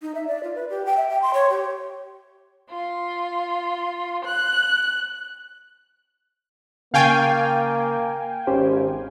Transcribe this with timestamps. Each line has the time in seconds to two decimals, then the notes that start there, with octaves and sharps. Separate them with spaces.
0.02 D#4
0.15 E5
0.27 D5
0.43 F4
0.55 B4
0.70 G4
0.86 G5
0.97 E5
1.10 G5
1.22 C6
1.34 C#5
1.50 G4
2.70 F4
4.26 F#6
6.94 C#3 A#3 F5 G5 G#5 C#6 A6
8.47 G#1 C#4 G4 C5